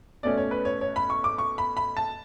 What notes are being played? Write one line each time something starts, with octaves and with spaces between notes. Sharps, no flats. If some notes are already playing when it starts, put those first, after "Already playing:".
B2 A3 C#4 D5
C#5
B4
C#5
C#5
B5
C#6
D6
C#6
B5
B5
A5